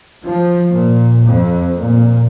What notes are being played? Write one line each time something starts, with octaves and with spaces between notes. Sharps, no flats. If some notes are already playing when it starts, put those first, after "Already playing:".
F3
A#2
F2
A#2